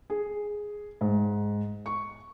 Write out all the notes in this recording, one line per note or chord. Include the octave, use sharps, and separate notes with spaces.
G#4
G#2
C#6